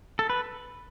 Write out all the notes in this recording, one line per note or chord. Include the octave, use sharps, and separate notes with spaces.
A4
B4